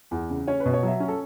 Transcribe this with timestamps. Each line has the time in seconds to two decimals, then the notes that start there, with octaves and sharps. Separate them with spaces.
0.11 E2
0.30 C#3
0.47 C#4 C#5
0.60 B4
0.66 B2
0.74 C#5
0.83 F#3 E5
1.00 C#4
1.08 A4